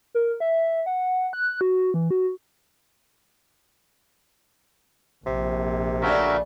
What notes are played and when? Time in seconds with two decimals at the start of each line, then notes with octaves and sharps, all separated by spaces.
0.15 A#4
0.40 E5
0.86 F#5
1.33 F#6
1.61 F#4
1.94 E3
2.11 F#4
5.26 A#1 C3
6.02 C#3 A3 D4 F#4 A#4 E5